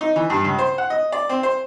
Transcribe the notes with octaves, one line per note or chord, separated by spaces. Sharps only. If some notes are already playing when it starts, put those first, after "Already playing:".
D#4
E3
G2
C#2
C5
F#5
D#5
D5
C4
C5